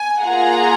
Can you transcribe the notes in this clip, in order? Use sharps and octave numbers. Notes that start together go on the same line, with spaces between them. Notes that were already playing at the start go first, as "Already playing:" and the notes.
Already playing: G#5
A#3 F4 G#4 F#5 A#5